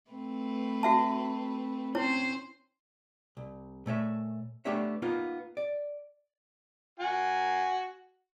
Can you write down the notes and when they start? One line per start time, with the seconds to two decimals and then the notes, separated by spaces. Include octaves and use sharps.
0.11 A3 C4 B4
0.83 F#4 E5 A5
1.95 C4 C#4 E4 C5 C#5
3.37 C2
3.86 A#2 A3 C#5 E5
4.65 A3 B3 D4 G4 C#5 E5
5.02 A#3 B3 D#4 F4
5.57 D5
7.00 F#4 G#5